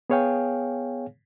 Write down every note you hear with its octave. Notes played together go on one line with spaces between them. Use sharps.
B3 G#4 C#5 F5 G5 G#5